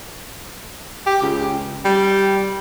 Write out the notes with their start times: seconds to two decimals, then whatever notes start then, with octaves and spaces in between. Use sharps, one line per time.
1.07 G4
1.22 C#2
1.85 G3